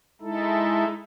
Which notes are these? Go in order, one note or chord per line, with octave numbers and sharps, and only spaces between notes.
G#3 D#4 E4 A4